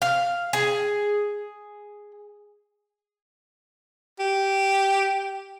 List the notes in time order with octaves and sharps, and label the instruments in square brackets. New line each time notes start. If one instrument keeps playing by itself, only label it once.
[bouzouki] F5
G#4
[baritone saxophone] G4